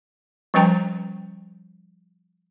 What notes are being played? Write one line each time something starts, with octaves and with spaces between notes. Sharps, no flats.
F3 G3 C#4 B4 G5 A#5